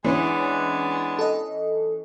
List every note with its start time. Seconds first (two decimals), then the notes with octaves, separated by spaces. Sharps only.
0.04 E3 G#3 B3 C#4 D4
1.19 A4 D#5